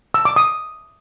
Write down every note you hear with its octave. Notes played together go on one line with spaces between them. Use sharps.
E6
D6
D#6